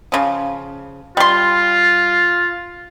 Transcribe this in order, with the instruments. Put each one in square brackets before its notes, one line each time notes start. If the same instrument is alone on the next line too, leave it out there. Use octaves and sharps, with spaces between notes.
[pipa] C#3 F3
[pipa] G3 C6 [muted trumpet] F4